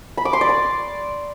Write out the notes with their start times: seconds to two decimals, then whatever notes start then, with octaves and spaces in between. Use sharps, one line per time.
0.17 B5
0.25 D6
0.33 C6
0.41 D5
0.49 D6